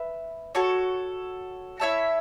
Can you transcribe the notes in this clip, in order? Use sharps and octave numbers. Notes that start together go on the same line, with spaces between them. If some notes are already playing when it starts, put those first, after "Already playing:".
Already playing: B4 E5
F#4 A4 C#5
E4 C#5 E5 A5